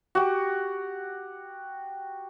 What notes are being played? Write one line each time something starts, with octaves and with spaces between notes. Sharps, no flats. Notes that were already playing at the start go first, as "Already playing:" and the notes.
F#4 G4